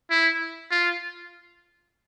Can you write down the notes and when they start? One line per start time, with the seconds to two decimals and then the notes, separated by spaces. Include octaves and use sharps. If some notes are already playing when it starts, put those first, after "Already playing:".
0.10 E4
0.71 F4